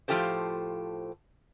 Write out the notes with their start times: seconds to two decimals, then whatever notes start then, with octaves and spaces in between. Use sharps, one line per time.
0.08 A2 F3 F4 G4 A4 C5